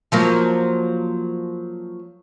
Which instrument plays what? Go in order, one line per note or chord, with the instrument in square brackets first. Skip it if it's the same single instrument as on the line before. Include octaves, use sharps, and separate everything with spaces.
[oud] F3 F#3 A#3